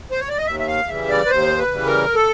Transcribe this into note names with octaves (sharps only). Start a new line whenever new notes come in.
C5
C#5
D5
D#5
D#2 E5
E5
F5
C#3 E3 G3 E5
D5
B4
D#2 C5
B4
C#3 E3 G3
A#4
A4